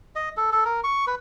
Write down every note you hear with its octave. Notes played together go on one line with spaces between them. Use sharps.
D#5
A4
A4
A#4
C#6
B4